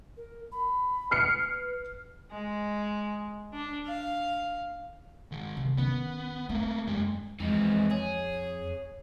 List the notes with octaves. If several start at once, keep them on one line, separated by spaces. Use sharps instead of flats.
A#4
B5
B4 F6 C7 C#7
G#3
D4
F5
D#3 G#4
C3
D#3 B3 C#4
A3 A#3 C4
F#2 G#3 G4
F2 E3 G#3 C4
G#4 C#5